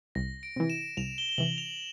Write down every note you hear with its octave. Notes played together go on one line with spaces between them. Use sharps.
C2 A#6
D7
C3 E3
E7
C2 F7
G7
G7
C3 E3 F#7
F7